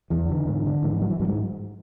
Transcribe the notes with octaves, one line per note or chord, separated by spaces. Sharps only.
E2 E3
D3 E3
G#2 D3
D3
G#2 E3
E3
F#3
E3
G#2 F#3
G#3